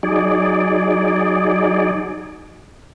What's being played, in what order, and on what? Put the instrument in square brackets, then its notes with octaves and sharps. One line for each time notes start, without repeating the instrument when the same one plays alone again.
[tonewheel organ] F#3 D#4 G#4 D5